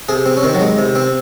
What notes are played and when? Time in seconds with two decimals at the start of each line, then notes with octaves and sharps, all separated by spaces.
0.09 C3 G#4
0.26 C4
0.37 C#4
0.43 D#3 C4
0.54 F#3
0.61 G#3
0.78 C3
0.95 C4